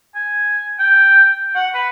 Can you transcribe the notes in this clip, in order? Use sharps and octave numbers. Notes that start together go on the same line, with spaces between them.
G#5
G5
F#5
B4